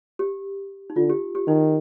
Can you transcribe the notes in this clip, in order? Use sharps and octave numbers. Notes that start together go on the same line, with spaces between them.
G4
D#4
D3 F4
G4
G4
D#3 D#4